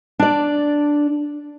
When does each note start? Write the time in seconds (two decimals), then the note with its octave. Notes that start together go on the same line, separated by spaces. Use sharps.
0.19 D4 D5